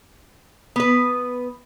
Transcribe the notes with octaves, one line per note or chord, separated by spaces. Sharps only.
B3 B4